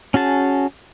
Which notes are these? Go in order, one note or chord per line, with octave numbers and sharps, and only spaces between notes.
C#4 F#4 G#4 A5